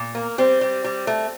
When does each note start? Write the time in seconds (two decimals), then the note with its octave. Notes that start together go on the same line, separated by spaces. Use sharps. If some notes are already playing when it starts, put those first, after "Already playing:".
Already playing: A#2
0.15 A#3
0.38 G3 C4
0.61 G3
0.84 G3
1.07 A3